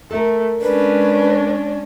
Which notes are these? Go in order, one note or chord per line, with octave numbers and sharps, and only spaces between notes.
A3 A4 A#4
G#3 C#4 D4 B4